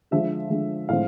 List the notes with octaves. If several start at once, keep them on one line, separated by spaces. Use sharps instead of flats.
D3 F3 G#3 E5
D3 F3 G#3
A2 F3 G#3 C4 F5